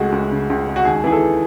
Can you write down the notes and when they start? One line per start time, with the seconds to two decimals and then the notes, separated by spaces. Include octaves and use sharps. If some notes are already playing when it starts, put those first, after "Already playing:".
Already playing: C#2 G#3 A3 F#4
0.12 C#2
0.31 C#3
0.50 C#2
0.67 G#3
0.76 F#4
0.85 D#2 G#4
1.04 E3 G#4
1.12 A4